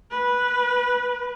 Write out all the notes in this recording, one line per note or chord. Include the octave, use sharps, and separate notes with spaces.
B4